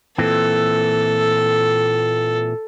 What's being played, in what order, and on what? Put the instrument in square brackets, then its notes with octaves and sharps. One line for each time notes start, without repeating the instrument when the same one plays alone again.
[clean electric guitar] A#2 E3 C4 [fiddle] A4